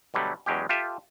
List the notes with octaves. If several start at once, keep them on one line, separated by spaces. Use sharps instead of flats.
B2 D3 F#3 G3 A3
E2 F#3 G#3 C#4 G4
F4 G4 A4 E5